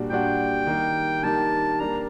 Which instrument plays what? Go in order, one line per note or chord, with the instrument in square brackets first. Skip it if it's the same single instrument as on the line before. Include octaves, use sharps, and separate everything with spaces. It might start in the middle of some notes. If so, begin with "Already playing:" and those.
Already playing: [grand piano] A#2 G3 D4 F#4
[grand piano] A#2 G3 D4 F#4 [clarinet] G5
[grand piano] D#3 G3 A#3
[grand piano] D#3 G3 A#3 [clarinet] A5
[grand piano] G3 A#3 D4 [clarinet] A#5